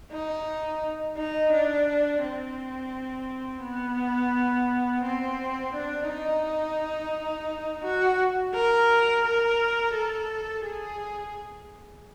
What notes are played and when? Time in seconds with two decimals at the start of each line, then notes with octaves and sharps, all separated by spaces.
0.12 D#4
1.17 D#4
1.53 D4
2.23 C4
3.63 B3
5.03 C4
5.74 D4
6.08 D#4
7.84 F#4
8.54 A#4
9.25 A#4
9.94 A4
10.65 G#4